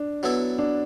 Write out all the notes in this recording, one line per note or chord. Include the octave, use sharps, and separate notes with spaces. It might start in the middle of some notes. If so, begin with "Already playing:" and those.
Already playing: D4
F#3 B3 E4 A4
D4